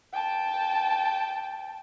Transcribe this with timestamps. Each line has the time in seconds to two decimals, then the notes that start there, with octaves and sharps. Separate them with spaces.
0.12 G5 A5